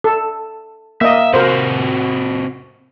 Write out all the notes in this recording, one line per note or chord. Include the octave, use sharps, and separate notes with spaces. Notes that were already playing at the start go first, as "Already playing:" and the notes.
A4
A#3 D#5 E5
C3 F#4 A#4 C5